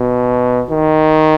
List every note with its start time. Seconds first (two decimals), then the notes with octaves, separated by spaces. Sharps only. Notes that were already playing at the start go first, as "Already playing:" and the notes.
Already playing: B2
0.70 D#3